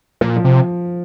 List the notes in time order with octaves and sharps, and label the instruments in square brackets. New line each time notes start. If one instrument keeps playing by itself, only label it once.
[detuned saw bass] A#2 [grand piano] F3
[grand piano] F3
[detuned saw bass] C3